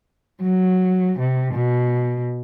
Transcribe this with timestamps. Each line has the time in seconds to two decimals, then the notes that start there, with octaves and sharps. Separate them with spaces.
0.41 F#3
1.19 C3
1.53 B2